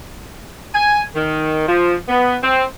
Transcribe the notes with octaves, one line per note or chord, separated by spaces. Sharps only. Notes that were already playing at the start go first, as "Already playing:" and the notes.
G#5
D#3
F3
B3
C4